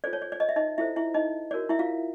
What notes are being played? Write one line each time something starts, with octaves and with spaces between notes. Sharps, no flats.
F4 A4 C5 D5
C#5
D5
D5
D#5
E5
D#4 D#5
E4 F4 A4 C5 E5
E4 E5
D#4 D#5
F#4 A#4 C#5 D5
E4 E5
F4 F5